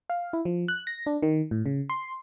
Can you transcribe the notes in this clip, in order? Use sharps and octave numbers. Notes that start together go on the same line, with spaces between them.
F5
E4
F3
F#6
A#6
D4
D#3
A2
C#3
C6